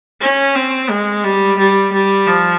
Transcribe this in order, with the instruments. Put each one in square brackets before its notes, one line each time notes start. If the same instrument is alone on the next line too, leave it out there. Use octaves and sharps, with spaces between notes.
[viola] C#4
C4
G#3
G3
G3
G3
F3